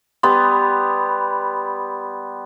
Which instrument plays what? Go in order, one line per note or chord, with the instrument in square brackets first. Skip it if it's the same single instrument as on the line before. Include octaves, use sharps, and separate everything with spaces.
[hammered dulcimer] G3 B3 [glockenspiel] C6